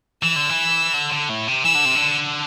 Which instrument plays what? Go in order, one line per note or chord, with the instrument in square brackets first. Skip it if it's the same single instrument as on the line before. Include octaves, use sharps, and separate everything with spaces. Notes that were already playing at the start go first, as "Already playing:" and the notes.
[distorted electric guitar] E3 [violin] E6
[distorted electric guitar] D3
E3
D3
D3
A2
C3
[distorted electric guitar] E3 [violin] E6
[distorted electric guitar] D3
C3
D3